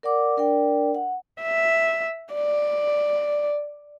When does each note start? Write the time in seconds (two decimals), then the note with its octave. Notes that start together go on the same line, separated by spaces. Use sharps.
0.03 A#4 D5 F#5 D6
0.37 D4 A#4 D5 G5
0.95 F#5
1.42 E5
2.34 D5